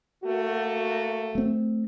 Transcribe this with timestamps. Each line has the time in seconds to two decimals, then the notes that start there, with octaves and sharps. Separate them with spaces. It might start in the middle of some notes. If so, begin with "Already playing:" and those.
0.24 A3 A#3 F#4
1.35 A3 C4